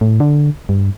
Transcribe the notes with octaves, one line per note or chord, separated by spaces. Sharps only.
A2
D3
G2